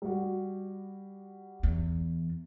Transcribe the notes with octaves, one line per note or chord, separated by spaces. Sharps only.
G3 F#4
E2